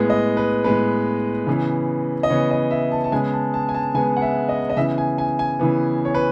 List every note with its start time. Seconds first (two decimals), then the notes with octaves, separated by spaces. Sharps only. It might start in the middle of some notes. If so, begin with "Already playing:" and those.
Already playing: A2 G#3 B3
0.10 D#5
0.37 B4
0.64 A2 G#3 B3 B4
1.47 C#3 E3 B3
2.23 D#5
2.30 C#3 E3 B3 C#5
2.51 D#5
2.71 E5
2.92 A5
3.04 A5
3.12 C#3 G#3 B3 G#5
3.33 A5
3.54 A5
3.69 G#5
3.74 A5
3.94 C#3 G#3 B3 G#5
4.17 F#5
4.22 E5
4.49 D#5
4.69 D#5
4.76 C#3 E3 B3 E5
4.98 G#5
5.18 G#5
5.39 G#5
5.59 C#3 E3 B3
6.05 C#5
6.15 B4